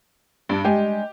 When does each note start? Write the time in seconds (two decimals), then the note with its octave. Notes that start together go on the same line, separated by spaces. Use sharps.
0.49 G2 D4
0.65 G3 G#3 G4 G#5